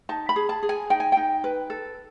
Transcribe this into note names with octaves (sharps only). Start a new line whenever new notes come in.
D#4 A5
B5
G#4
A5
G#4
G#5
D#4 G5
G#5
D#4 G5
B4
A4